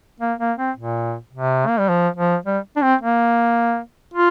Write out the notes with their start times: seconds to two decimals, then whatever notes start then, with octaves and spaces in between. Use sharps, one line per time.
0.20 A#3
0.40 A#3
0.58 C4
0.77 A#2
1.33 C3
1.67 A#3
1.79 G3
1.89 F3
2.17 F3
2.46 G3
2.77 D4
2.82 C4
3.01 A#3
4.14 F4